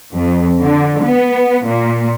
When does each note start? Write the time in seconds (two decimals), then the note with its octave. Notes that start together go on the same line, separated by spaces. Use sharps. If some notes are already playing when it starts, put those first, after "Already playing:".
0.14 F2
0.62 D3
1.04 B3
1.66 A#2